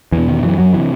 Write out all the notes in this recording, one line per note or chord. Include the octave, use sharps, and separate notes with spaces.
E2 E3
B2
D#3
F#2 E3
F#2 F#3
C3 E3